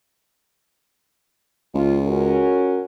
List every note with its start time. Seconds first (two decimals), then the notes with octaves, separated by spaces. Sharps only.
1.75 C#2 F4
2.07 C#4 F#4 A#4